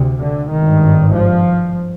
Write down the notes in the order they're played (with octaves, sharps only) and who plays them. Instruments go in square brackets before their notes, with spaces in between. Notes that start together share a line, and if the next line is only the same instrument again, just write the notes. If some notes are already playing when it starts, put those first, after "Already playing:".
Already playing: [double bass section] D2 C3
D3
G#1 G2 D#3
F3